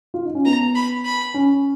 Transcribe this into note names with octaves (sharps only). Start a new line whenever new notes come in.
F4
D#4
C#4
B3 A#5
B5
B5
C#4